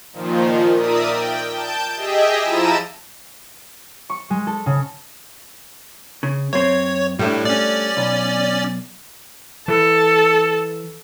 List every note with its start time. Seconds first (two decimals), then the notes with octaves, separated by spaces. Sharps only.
0.13 A#2 D#3 F3
0.75 A#4 D5 E5 D#6
1.10 G5
1.51 A5 G6 D7
1.96 G4 G#4 D#5 E5 G5
2.40 F3 E4 A5 A#5 E6 D#7
4.10 C#6
4.30 G#3
4.47 A4
4.66 C#3
6.23 C#3
6.53 F#2 C4 C#5
7.19 A2 G3 A3 D4
7.45 C#4 D5
7.97 B1
9.68 E3 A4